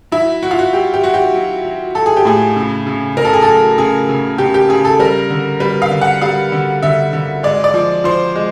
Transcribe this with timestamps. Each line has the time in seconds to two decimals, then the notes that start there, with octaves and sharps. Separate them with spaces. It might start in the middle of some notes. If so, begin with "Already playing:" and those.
0.12 F#3 E4
0.42 F#3 F#4
0.51 F4
0.59 F#4
0.73 F#3 G4
0.94 G4
1.03 F#3 F#4
1.14 G4
1.34 F#3
1.65 F#3
1.95 F#3 A4
2.06 G#4
2.17 G4
2.25 A2 G#4
2.56 C#3
2.87 C#3
3.17 C#3 A#4
3.25 A4
3.33 G#4
3.42 F#3 A4
3.78 C#3 G#4
4.09 C#3
4.38 C#3 G4
4.54 G4
4.69 C#3 G#4
4.85 A4
4.99 G3 A#4
5.30 D3
5.60 G3 B4
5.82 F5
5.91 D3
6.01 F#5
6.21 G3 F5
6.52 D3
6.83 D3 E5
7.13 D3
7.43 G#3 D5
7.64 D5
7.74 F3
8.04 F3 C5
8.35 G#3